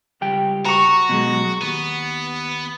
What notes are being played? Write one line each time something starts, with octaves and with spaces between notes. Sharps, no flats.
C#2 G3 G5
F#4 A#5 C#6
B2 F#3 G#3
D#2 B3